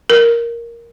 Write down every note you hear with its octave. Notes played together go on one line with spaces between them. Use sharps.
A#4